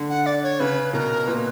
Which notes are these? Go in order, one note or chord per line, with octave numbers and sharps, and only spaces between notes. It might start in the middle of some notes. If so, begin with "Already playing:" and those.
Already playing: D3
F#5
D5
C#5
C#3 B4
B2 A#4
A#2 B4